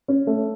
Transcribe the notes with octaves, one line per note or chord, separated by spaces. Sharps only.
C#4
A3